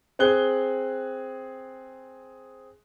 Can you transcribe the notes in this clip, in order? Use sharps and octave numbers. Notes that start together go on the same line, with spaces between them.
C4 G#4 F#6 G7